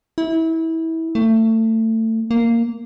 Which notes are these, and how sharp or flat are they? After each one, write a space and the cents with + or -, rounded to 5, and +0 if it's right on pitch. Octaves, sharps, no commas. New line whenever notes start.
E4 -25
A3 +25
A#3 -10